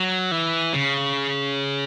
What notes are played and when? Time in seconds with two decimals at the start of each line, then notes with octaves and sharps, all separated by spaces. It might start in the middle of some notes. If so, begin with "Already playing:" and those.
Already playing: F#3
0.31 E3
0.73 C#3